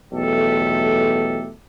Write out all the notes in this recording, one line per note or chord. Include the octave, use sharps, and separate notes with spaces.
B1 E2 A3 G4 A4